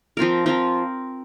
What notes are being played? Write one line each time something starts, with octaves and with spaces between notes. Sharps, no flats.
F3 C4 F4 A#4
F3 C4 F4 A#4